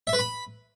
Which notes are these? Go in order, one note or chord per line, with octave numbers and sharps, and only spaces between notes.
E5
B4
B5